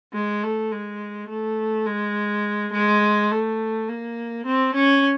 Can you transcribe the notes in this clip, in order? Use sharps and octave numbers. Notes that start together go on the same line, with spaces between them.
G#3
A3
G#3
A3
G#3
G#3
A3
A#3
C4
C#4